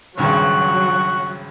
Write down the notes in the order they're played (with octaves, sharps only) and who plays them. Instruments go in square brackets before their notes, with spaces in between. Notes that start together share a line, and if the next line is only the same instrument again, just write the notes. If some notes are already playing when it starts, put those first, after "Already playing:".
[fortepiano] G#1 C#2 G2 [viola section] F#3 [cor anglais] F#4